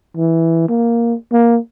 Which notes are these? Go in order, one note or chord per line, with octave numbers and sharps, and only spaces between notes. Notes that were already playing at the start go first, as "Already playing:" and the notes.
E3
A#3
A#3